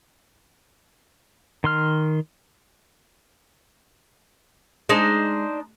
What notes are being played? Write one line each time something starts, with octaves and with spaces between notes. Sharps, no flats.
D#3 C6 F6
G#3 D4 D#4 C5